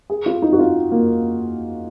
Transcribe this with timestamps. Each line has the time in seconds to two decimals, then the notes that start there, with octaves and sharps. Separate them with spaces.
0.10 G#4
0.26 F4
0.42 D#4
0.53 F#4
0.59 F4
0.92 A#3